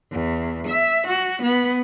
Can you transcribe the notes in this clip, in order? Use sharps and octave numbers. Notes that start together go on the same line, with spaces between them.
E2
E5
F#4
B3